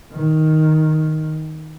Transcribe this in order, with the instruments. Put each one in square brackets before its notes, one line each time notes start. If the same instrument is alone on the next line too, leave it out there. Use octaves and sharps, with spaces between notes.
[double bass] D#3